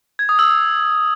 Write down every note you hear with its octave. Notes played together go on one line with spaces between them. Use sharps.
G#6
D#6
E6